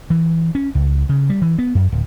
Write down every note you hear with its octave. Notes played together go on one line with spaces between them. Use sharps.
E3
C#4
C#2
C#3
G3
E3
B3
F#2
D1